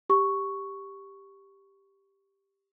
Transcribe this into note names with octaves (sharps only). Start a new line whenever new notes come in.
G4 C#6